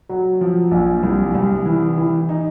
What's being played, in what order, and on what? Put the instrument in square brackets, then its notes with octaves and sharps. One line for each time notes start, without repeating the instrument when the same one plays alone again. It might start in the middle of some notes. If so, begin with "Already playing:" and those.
[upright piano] F#3
F3
A#1
C2
C2
E3
E3
D#4